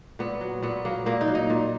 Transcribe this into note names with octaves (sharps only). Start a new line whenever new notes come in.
A#2 B3
F#3
A#2 B3
F#3 A#3
A#2 A#3
D#4
F#3
D#4
A#2